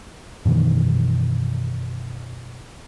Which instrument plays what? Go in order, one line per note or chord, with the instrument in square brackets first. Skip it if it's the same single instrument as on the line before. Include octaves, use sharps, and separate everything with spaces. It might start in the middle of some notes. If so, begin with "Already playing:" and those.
[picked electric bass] F#2 B2 D#3 E3